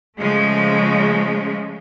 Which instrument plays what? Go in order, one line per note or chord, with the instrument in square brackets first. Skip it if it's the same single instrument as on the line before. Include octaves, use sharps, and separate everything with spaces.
[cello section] C#3 F3 G#3 A3